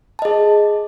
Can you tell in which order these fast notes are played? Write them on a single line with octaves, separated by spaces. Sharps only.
A5 D#5 G#4